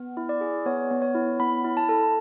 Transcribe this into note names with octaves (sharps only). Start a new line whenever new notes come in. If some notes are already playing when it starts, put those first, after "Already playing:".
Already playing: B3
E4
D5
G#4
B3 C#5
B3
C#5
E4
B3 B5
E4
A5
A4